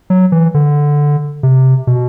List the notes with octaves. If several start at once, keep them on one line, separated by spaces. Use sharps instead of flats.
F#3
E3
D3
C3
B2